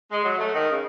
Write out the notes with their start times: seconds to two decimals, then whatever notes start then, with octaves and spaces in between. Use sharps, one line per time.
0.11 G#3
0.24 F#3
0.38 A3
0.54 D#3
0.70 C#3